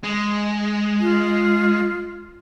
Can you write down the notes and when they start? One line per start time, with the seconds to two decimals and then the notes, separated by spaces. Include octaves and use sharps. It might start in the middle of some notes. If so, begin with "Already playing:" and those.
0.03 G#3
1.00 F4